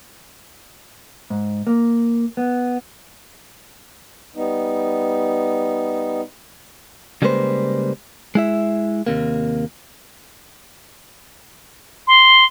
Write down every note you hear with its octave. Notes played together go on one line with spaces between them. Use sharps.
G#2
A#3
B3
G3 B3 D#4
C#3 G3 G#3 A#3 B4 C5
G#3 E4 E5
D#2 C3 A#3
C6